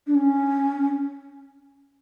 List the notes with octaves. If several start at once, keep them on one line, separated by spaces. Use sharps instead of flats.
D4
C#4